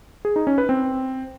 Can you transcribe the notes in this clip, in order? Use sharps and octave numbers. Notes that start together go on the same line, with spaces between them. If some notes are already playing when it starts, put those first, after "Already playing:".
G#4
D#4
C#4
B4
C4